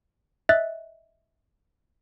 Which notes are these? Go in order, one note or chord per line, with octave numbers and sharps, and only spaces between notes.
D#5 E5 F#6 A6